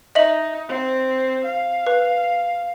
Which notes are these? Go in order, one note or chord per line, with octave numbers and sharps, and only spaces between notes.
D#4 D#5 E5 F#7
C4
F5
B4